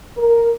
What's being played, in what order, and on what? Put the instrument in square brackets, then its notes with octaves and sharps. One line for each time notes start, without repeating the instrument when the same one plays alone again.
[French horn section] A#4